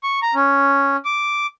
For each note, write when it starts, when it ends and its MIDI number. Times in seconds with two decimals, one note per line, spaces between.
0.03 0.20 85
0.22 0.34 82
0.35 0.97 61
1.05 1.46 86